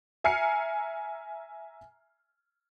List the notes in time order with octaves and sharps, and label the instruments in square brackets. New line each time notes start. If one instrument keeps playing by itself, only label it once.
[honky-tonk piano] E5 G#5 A#5 F6 C7 C#7